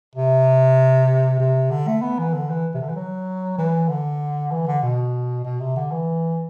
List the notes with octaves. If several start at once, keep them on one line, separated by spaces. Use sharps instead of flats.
C3
C3
D3
A3
B3
E3
D3
E3
C3
D3
E3
F#3
E3
D3
E3
D3
B2
B2
C3
D3
E3